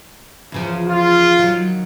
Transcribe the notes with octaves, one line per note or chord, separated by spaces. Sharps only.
E2 C#3 F3
F4
D#3 F#3